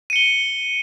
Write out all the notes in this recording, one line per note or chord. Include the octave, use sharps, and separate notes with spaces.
C#7 D#7 G7